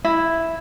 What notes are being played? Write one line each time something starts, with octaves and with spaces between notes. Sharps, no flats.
E4